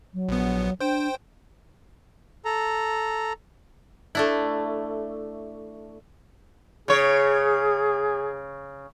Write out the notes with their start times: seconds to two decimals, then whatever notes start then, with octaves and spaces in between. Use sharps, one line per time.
0.14 F#3
0.29 A#1 B3
0.80 D4 C5 G5
2.45 A4 A#5
4.15 A3 D4 E4
6.88 C#3 G#4 C#5